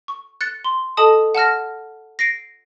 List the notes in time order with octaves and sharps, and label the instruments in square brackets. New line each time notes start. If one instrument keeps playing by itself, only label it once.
[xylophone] C#6
F#6 A6 C#7
C6
A4 D#5 A5 D#6
F#5 A5 F6 A#6
A#6 C7 D7